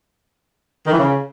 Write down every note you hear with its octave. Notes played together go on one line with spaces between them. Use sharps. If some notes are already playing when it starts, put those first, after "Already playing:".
D#3
E3
C#3